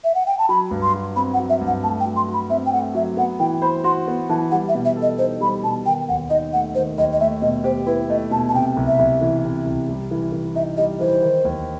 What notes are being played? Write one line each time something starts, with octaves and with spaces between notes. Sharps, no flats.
E5
F#5
G5
A5
F#3 B5
G2
C6
F#4
C4 B5
F#5
F#3
E5
G2
F#5
A3 A5
G5
F#3
C6
F#4
B5
C4 E5
G5
A3 F#5
F#3 E5
B3 F#5
E3 G5
C5 B5
F#4 C6
B3
E3 A5
G3 F#5
E5
B2
E5
A4
D#5
D#4 C5
G3 B5
B2 A5
D#3 G5
D#2 F#5
D#4 D#5
A3 F#5
D#3 C5
D#2 D#5
D#5
A3 E5
B2 D#5
G4 C5
E4 B4
A3 D#5
B2 A5
A5
C3 G5
C2
E5
C2
E3
C3
C2
G3
E3
E3
D#4 E5
G3 D#5
E3 C5
D#3
D#2